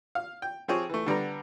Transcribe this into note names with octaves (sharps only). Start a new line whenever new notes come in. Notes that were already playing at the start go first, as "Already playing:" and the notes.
F5
G5
F3 C4 G4 G#4 C#5
E3 A3
D3 G3 B3 A#5